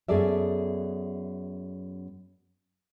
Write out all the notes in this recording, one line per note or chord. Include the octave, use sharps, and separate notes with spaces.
F#2 B3 G#4 A4 D5 E5